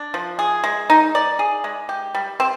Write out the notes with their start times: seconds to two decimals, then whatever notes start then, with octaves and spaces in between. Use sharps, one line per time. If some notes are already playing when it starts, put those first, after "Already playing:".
Already playing: D4
0.14 F3
0.39 G#4
0.64 G#3
0.90 D#4
1.15 D5
1.39 G#4
1.64 G#3
1.89 G4
2.15 G3
2.40 C4